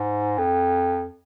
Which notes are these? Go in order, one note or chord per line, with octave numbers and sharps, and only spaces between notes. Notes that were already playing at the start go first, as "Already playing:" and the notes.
Already playing: G#2
F2